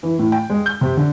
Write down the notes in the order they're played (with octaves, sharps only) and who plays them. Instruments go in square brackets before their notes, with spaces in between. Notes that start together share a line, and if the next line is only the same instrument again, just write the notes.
[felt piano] E3
A2
G5
G#3
G6
C3
D3